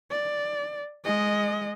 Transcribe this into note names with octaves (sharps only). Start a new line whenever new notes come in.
D5
G#3 D#5